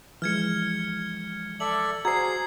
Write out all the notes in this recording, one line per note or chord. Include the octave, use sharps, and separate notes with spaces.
E3 F3 G#3 F6 G#6 C#7
A4 D5 E5 F#7
F#4 G#4 C5 A#5 G#6 C7